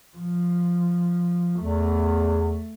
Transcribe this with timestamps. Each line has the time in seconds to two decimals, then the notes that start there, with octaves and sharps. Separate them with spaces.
0.17 F3
1.60 E2 A3